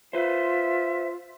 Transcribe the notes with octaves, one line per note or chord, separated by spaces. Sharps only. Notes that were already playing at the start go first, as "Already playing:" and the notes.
F4 B4 C5 E5